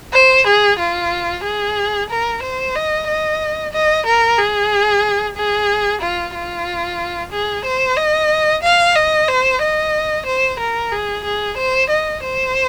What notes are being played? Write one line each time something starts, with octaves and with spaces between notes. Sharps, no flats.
C5
G#4
F4
G#4
A#4
C5
D#5
D#5
D#5
A#4
G#4
G#4
F4
F4
G#4
C5
D#5
F5
D#5
C5
D#5
C5
A#4
G#4
G#4
C5
D#5
C5